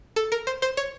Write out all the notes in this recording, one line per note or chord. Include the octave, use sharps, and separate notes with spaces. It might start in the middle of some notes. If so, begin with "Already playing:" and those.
A4
A#4
C5
C5
C#5